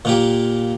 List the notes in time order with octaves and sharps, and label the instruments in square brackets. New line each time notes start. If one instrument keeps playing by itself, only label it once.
[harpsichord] A#2 A#3 G4